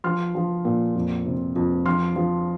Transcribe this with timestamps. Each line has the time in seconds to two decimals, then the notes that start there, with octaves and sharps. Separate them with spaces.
0.04 F3 C6 F6
0.35 F3
0.65 A#2
0.95 F2
1.26 C3
1.56 F2
1.86 F3 C6 F6
2.16 F3